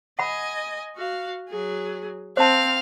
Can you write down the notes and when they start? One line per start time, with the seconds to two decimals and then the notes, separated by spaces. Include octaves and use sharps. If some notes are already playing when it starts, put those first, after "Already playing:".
0.19 D#5 F#5 G#5 B5
0.97 F#4 F5
1.49 F#3 G#4
2.37 C4 C5 F5 A5 F6